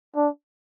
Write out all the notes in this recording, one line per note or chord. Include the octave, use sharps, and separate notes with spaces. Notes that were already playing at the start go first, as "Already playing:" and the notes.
D4